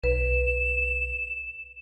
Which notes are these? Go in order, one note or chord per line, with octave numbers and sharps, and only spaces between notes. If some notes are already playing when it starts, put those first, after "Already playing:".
B1 B4 E7